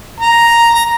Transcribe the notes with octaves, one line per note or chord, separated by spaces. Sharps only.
A#5
A#5